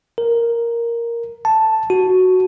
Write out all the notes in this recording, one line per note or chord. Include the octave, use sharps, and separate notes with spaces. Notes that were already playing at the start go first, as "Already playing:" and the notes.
A#4
A5
F#4